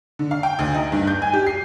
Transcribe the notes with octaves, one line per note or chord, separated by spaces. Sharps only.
D3
F5
G5
D2
D#4
G2
G6
G#5
G4
C7